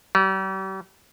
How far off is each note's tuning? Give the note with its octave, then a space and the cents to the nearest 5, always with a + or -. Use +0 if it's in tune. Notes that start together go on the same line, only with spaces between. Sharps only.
G3 -40